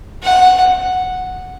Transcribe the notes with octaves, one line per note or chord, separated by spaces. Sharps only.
F#5